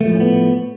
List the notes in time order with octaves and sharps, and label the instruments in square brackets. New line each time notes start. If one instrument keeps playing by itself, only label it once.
[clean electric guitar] A3
F3
A2
C#4
B3